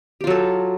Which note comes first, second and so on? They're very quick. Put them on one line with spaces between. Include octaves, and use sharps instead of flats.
G4 F4 F#3 A4